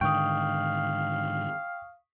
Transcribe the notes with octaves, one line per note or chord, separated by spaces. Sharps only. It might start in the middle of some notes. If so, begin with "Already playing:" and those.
G#2 D3 D#3 F5 G5 C#6 D#6